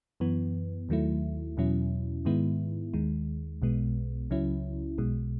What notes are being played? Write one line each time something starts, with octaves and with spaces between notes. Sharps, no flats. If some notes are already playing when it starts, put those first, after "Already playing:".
F#2 E3 B3
D#2 D#3 F#3 A3 E4
E2 B2 F#3 C#4 E4
G#2 D#3 G#3 B3 E4
D#2 D#3 G#3
B1 B2 G#3 B3
C#2 C#3 F#3 C#4 E4
B1 B2 G#3